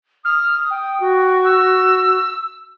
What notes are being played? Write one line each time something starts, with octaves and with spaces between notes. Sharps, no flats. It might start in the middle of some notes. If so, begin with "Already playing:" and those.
D#6 F6
G5
F#4
E6